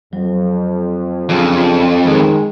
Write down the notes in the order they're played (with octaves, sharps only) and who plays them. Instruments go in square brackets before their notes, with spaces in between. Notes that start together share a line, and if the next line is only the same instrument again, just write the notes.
[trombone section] F2 [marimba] F#3
[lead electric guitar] F2 [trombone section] C#3 D4 [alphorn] F4
[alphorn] D#3 [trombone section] G#3